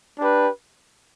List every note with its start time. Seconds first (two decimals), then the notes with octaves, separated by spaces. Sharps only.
0.18 D4 G4 B4